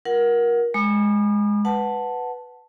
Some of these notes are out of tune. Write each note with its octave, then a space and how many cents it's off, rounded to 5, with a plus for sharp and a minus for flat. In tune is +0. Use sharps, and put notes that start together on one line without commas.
F4 +0 A#4 +20 F#5 +0
G#3 +0 B5 -30 D#6 -45
B4 +5 F#5 +0 A5 +0